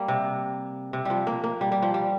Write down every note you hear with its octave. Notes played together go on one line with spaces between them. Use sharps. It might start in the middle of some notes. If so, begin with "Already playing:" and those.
Already playing: G3 A#3
C3
C3
F3 G3
A#3
A#3
G3
G3
F3
G3